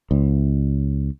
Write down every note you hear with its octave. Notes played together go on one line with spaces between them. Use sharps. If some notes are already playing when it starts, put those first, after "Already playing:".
C#2